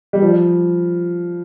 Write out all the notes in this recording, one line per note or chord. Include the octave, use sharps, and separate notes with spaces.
G3
F3